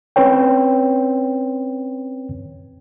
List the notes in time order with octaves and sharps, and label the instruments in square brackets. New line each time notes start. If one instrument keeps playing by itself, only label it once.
[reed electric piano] C4 C#4 B4 C#5 G5